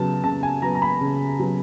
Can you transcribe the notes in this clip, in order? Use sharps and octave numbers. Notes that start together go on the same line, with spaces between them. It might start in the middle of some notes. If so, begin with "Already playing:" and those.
Already playing: C#3 F#3 B3 A5
C#3 A5
G#5
F#3 B3 A#5
A#5
B5
C#3
F#3 B3